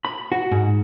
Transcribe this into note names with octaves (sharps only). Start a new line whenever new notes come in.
B5
F#4
G#2